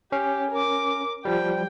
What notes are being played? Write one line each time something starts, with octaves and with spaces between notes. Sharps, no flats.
C#4 G4
A#4 D6
F3 G3 G5